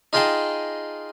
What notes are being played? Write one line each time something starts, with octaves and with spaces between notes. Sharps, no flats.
D#4 F4 G#4 D#5 G5 A5